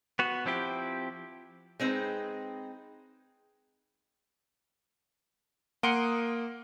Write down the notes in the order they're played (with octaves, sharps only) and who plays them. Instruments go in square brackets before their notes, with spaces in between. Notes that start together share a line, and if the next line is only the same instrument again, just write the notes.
[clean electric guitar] B3 F#4
F3 C4 E4 G4
[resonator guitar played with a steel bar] G#3 C4 D#4 B4
[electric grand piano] A#3 D7 [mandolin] F#5 C6 D#6